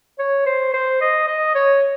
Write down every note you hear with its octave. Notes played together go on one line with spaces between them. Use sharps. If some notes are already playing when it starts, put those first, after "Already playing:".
C#5
C5
C5
D#5
D#5
C#5